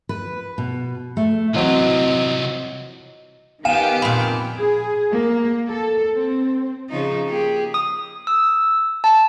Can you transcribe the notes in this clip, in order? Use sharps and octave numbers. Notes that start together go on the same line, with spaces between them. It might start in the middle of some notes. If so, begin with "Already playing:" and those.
B4
B2
A3
C2 E3 F#3 C4 F4 D#5 D6
D#3 B3 G4 F5 G#5 E7
F2 A#2 B5
G#4
A#3
A4
C4
C#3 F3 D#4
A#3 G4 G#4
D#6
E6
A5